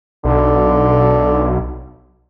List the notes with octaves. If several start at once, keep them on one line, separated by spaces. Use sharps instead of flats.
B1 D3